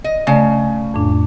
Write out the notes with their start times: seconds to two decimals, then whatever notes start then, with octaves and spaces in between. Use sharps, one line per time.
0.04 D#5
0.27 C#3 A3 D5
0.94 F2 A2 D4